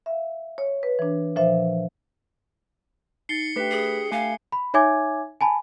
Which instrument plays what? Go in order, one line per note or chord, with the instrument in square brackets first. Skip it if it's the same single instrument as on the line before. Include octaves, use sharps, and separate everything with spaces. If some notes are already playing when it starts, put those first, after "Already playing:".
[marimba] E5 F5
C#5
B4
E3 D4
A#2 F3 C5 E5
[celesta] D#4 A6 [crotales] C7 C#7 G7
[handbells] A3 B4 B6 [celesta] D4 G4 G5
[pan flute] G#4
[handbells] A3 G#5 [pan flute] F5
[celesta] B5
D#4 C#5 E5 G#5 D6 G#6
G#5 A5 B5